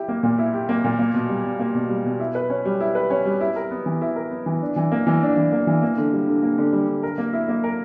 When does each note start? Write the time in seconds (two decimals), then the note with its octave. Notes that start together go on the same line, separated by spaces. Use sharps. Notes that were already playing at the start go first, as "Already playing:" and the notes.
Already playing: E4 G4
0.08 A#3
0.23 A#2
0.38 E4
0.53 G4
0.69 A#3
0.84 A#2
0.99 A#3
1.14 B2
1.29 G3
1.45 B2
1.59 A#3
1.75 B2
1.89 G3
2.05 B2
2.19 E4
2.35 B4
2.50 C#4
2.65 G3
2.80 E4
2.95 B4
3.10 C#4
3.25 G3
3.40 E4
3.56 A#4
3.71 B3
3.86 E3
4.01 E4
4.16 A#4
4.31 B3
4.46 E3
4.61 D4
4.76 E3
4.92 A#3
5.07 E3
5.22 D4
5.37 E3
5.52 A#3
5.67 E3
5.82 A#3
5.97 D3
6.13 G3
6.27 D3
6.43 A#3
6.58 D3
6.73 G3
6.88 D3
7.03 A#4
7.18 A#3
7.33 E4
7.48 A#3
7.64 A#4